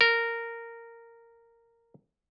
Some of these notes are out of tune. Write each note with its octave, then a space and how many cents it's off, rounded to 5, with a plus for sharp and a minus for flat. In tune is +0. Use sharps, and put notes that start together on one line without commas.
A#4 -10